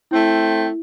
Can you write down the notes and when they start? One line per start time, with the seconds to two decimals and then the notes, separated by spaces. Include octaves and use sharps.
0.11 A3 C4 E4 G5